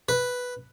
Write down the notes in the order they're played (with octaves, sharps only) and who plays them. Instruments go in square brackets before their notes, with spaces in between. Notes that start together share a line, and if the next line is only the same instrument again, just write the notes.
[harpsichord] B4